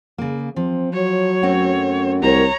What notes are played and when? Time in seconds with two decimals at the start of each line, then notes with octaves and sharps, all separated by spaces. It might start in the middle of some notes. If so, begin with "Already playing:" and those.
0.18 C#3 A#3
0.56 F3 C4
0.94 F#3 C#5
1.43 F#2 A3 C4 F#4
2.23 C2 A#4 C#5 A#5